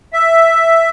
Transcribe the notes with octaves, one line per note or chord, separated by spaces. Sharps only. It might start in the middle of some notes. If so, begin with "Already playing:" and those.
E5